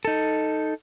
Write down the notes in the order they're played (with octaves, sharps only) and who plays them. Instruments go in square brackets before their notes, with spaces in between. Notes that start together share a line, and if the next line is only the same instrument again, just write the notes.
[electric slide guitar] D#4 A4